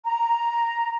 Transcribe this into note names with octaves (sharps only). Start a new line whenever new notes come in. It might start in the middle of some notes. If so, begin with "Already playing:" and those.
A#5